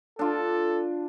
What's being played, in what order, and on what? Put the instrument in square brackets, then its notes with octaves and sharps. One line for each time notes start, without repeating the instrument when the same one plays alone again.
[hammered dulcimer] D4 F4 [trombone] A4